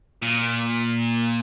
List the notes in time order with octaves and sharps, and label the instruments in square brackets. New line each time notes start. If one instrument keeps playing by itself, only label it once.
[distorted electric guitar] A#2